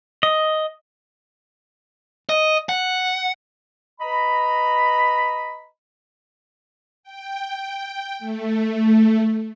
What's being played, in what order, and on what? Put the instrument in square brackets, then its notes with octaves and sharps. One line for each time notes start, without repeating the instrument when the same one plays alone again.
[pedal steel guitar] D#5
[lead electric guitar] D#5
F#5
[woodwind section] B4 D#5 A#5 B5
[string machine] G5
A3